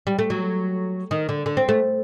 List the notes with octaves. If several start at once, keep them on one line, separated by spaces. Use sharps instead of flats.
G3
A3
F#3
D#3
D3
D3
C4
A3